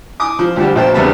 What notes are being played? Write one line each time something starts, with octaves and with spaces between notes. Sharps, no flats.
G#5 D6 D#6
F3
D2 F3 G3 G4
A#1 B2 C5 G5 A5
E2 C#3 G3 B3 D4 B4